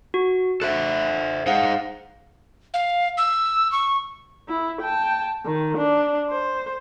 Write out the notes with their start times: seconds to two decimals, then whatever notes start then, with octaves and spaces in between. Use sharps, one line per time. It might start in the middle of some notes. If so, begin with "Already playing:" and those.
0.14 F#4
0.62 A4 C5 E5 F#6
1.46 D#4 G#4 C5 F5 F#5
2.74 F5
3.17 E6
3.72 C#6
4.49 E4
4.81 G5 A5
5.46 D#3
5.78 D4
6.30 C5